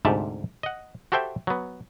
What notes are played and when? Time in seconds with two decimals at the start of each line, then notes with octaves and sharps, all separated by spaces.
0.05 D2 G#2 C3 G4 E5 A5
0.63 D#5 F#5
1.12 F#4 G4 A4 C5 E5 G5
1.47 F#3 B3